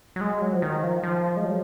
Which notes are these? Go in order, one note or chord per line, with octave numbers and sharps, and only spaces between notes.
F#3
G#3
F#3
F3
D#3
F3
F3
G#3
F#3